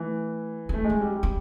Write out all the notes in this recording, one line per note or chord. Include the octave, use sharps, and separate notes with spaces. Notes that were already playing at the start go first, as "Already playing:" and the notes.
Already playing: E3 A3
A3 C4
G#3
C4
G3
G3
C4